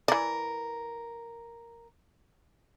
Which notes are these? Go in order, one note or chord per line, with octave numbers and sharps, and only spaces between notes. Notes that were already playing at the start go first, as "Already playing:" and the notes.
E3 A#4 D5